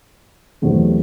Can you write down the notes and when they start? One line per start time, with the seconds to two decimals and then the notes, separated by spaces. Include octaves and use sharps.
0.62 E2 C3 F#3 A3